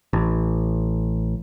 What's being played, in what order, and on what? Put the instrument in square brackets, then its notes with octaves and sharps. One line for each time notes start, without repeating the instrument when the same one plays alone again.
[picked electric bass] A1